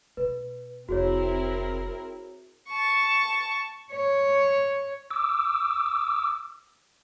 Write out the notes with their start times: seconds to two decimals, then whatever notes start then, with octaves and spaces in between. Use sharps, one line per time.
0.17 B2 B4
0.89 F1 C4 E4 F#4 G#4 A#4 C#5
2.69 A5 C#6
3.92 C#5
5.11 D6 E6